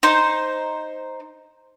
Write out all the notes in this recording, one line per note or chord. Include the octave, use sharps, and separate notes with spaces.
D#4 C5